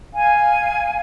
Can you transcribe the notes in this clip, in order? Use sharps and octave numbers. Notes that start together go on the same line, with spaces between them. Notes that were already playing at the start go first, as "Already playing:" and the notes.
F5 G#5